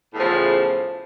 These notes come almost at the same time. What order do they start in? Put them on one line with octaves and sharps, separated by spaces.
A2 E2 F3 C#3